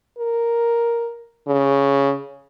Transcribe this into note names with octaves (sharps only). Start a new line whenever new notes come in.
A#4
C#3